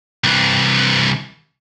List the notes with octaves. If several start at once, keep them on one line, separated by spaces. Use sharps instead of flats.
C2 E3